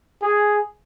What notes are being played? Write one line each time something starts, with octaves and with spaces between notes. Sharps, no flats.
G#4